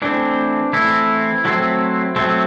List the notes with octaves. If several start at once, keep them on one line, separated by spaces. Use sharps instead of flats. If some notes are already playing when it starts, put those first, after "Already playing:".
E3 A3 C4 D4
E3 A3 C4 E4
F#3 A3 C4
F#3 A3 C4